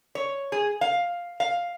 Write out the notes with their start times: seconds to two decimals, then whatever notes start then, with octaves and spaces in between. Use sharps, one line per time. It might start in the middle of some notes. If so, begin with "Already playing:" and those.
0.15 C#5
0.52 G#4
0.81 F5
1.40 F5